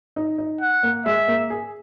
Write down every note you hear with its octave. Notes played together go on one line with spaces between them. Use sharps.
D#4
D#4
F#5
A#3
G#3 E5
A#3
G#4